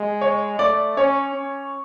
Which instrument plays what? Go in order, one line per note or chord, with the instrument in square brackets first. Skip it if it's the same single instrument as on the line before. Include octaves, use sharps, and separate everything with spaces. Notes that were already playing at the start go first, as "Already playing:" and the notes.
Already playing: [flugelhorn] G#3
[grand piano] C#5
[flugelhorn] A3 [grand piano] D5
[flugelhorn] C#4 [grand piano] C#5
[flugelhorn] C#4